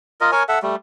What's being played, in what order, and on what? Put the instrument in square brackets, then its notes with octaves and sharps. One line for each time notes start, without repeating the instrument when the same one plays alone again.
[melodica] F4 A#4 D#5
A#4 C#5 G#5
A4 E5 F#5
G3 A3